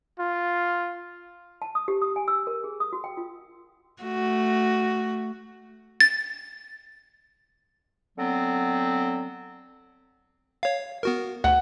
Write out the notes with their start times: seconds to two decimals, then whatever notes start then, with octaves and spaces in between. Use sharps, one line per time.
0.19 F4
1.62 A5
1.75 D#6
1.88 G4
2.02 D#6
2.16 G#5
2.28 E6
2.47 A#4
2.64 G#4
2.80 D#6
2.93 F#4
3.04 G5
3.17 F4
4.03 A3 F#4
6.00 A6
8.17 D3 F#3 B3 C4
10.63 C#5 F5
11.03 B3 F#4 A#4
11.44 D2 F#5